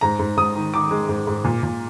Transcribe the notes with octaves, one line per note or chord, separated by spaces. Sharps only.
G#2 A#5
G#2
G#2 D#6
D#3
D#3 D6
G#3
G#2
G#2
A#2
A#2